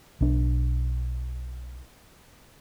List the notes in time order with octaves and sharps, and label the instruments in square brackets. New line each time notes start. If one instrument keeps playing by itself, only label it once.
[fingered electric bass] B1 D4